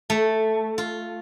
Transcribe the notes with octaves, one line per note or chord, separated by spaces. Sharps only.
A3
F4